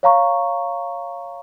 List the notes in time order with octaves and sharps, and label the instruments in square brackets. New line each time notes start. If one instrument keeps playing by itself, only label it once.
[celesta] C#5 F5 A#5 C#6